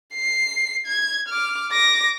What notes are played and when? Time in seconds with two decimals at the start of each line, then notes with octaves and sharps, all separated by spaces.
0.14 C7
0.87 G#6
1.29 D6 F6
1.72 D6 A#6